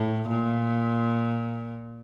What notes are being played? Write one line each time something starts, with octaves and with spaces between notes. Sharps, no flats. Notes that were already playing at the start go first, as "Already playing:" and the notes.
Already playing: A2
A#2